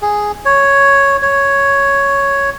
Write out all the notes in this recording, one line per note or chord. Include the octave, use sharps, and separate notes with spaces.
G#4
C#5
C#5